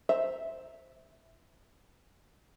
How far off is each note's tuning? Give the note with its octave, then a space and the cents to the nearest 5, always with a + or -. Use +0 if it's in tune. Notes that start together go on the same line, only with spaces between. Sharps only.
C5 +0 E5 +0 A#5 -10